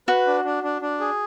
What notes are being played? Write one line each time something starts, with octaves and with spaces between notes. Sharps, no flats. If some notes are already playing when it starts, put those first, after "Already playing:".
F#4 B4
D4
D4
D4
D4
G#4